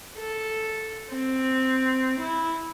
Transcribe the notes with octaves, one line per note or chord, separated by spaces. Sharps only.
A4
C4
E4